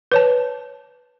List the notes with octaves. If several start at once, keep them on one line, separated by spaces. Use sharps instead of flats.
B4 C#5 A5